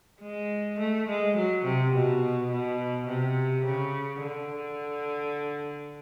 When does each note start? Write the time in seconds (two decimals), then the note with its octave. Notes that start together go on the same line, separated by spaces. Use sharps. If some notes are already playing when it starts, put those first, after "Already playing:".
0.22 G#3
0.79 A3
1.08 G#3
1.36 F#3
1.65 C3
1.94 B2
2.52 B2
3.09 C3
3.66 C#3
4.22 D3